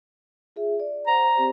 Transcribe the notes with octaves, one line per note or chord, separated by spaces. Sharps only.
F4 G#4 E5
D5
C5 F#5 A#5
C4 G4 C5